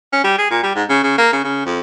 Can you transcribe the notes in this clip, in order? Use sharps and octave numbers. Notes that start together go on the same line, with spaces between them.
C#4
G3
G#4
A#2
G3
G#2
C#3
C#3
A#3
C#3
C#3
F2